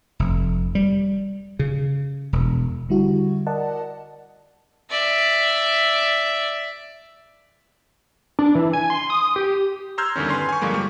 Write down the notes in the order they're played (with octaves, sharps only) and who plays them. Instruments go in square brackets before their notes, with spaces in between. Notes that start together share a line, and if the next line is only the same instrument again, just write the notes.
[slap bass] F1
G3
C#3
E1
[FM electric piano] D3 G3 E4 F#4
A#4 D5 D#5 F#5 A5
[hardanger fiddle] D5 E5
[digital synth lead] D4
E3
G#5
C6
D#6
G4
[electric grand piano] A#5 C6 E6 F6 G6 G#6
E2 G2 D3 D#3 C#4
B4 G#5 C6 F6
G#5 C#6
G2 D3 F3 G#3 A#3
F3 G3 C#6